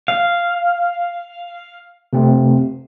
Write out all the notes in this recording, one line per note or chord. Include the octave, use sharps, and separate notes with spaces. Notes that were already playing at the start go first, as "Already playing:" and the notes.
F5
C3 A3 C4